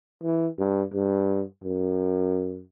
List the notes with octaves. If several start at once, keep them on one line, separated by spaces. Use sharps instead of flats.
E3
G2
G2
F#2